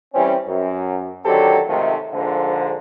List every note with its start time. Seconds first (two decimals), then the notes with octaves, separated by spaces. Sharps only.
0.14 E3 G3 C4 C#4
0.47 F#2
1.25 D3 D#3 F#3 C4 G4 A4
1.68 G#2 C3 D#3 F3 A3
2.13 A#1 G#2 D3 F3